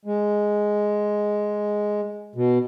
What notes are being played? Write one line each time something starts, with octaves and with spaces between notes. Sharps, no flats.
G#3
B2